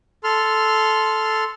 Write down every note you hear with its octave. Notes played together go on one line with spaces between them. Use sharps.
A4 C6 F6